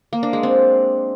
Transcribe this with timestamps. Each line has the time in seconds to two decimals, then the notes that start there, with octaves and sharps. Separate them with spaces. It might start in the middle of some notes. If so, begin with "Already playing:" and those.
0.13 A#3
0.23 D4
0.33 G#3
0.43 C4